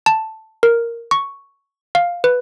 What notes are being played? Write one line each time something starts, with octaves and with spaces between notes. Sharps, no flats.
A5
A#4
C#6
F5
B4